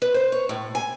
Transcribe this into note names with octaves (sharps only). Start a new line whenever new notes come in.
B4
C5
C#5
A2
G#5